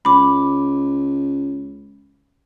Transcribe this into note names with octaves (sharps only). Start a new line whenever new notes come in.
C#2 B5 D6